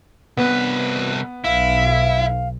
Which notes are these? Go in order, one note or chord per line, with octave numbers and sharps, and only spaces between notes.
C2 B3 B4
B1 E4 F5